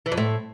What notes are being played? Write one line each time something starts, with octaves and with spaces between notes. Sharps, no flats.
E3
F2
A2